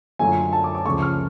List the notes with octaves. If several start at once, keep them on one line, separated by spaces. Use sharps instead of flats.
F#2 D3 F#3 A3 F4 G#5
A5
D6
D6
C#2 C#3 F3 A3 C#6
F6